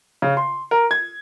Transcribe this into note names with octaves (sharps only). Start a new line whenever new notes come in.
C#3
C6
A#4
G#6